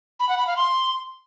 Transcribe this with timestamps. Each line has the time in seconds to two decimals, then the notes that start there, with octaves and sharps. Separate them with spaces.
0.20 B5
0.29 F#5
0.38 B5
0.47 F5
0.56 C6